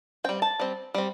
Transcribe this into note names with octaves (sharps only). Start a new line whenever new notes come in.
G3 C4 G5
A5
G3 C4
G3 C4